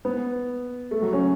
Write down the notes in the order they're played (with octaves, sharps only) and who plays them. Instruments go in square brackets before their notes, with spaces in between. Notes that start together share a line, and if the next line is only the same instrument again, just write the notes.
[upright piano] B3
A3
F#3
C#4